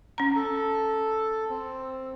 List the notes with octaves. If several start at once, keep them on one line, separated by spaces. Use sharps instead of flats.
C#4 A#5
A4
C4